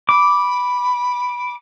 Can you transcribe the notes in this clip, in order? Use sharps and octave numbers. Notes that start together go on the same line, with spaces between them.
B5 D6